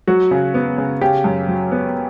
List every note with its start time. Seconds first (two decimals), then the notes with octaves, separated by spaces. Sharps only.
0.07 F#3 F#4
0.31 C#3
0.54 B3
0.78 C#3
1.01 C#3 G4
1.24 F#2
1.48 F#3
1.72 B3